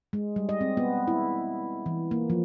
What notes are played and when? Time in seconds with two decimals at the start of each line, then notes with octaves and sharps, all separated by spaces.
0.13 G#3
0.36 G3
0.49 D#5
0.61 C4
0.77 B3
1.08 E4
1.86 E3
2.11 A#3
2.30 F3